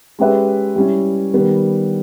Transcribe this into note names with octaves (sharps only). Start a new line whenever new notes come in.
G#3 C#4 G4 B4 E5
G3 C#4 E4
D#3 G3 B3